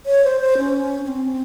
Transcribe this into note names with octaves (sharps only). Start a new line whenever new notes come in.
C#5
C5
C5
C#4
C#4
C4